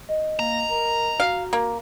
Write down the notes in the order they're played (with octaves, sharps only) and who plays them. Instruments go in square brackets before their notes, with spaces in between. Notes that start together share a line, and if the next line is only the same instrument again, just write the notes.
[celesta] D#5
[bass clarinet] A#3 [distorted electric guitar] A#5
[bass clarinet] A#4
[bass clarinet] F#4 [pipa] F5
[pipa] A#3